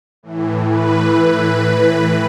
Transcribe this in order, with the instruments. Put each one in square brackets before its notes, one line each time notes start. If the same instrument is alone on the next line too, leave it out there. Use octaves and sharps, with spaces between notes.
[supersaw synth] A2 E3
B4
A2 E3